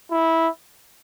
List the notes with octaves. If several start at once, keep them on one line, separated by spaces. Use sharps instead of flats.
E4